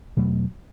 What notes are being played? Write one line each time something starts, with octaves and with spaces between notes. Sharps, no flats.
E2 B2 F#3 A3